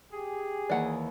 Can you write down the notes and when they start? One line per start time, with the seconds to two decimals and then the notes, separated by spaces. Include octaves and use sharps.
0.13 G4 G#4
0.69 D#2 E3 D5 F#5